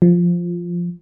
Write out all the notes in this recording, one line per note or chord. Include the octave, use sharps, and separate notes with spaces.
F3